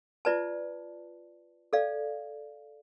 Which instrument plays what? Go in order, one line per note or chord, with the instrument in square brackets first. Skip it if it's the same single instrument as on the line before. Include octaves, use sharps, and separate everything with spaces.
[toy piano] F4 B4 D5 A5
A4 D5 F5